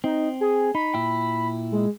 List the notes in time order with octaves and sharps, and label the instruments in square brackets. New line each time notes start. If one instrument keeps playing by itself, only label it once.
[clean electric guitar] C4 [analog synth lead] D#4
[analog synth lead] G#4
[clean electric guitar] D#4 [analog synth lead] B5
[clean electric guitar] A#2 E4 G5
[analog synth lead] G#3